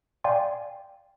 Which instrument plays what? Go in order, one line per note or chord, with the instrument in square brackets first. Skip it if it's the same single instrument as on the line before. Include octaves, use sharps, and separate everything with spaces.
[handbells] D5 F5 G5 G#5 C6